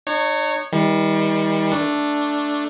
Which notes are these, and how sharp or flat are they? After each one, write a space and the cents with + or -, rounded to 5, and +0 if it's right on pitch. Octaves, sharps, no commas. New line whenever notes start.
D#4 -40 C#5 +0
D#3 +45 G3 +30
A3 +0 D4 +0